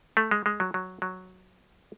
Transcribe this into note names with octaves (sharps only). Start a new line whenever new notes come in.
A3
G#3
G#3
F#3
F#3
F#3